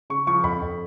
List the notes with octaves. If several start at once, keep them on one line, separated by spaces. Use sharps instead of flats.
C#3 C#6
F3 C#6
F2 B5
F2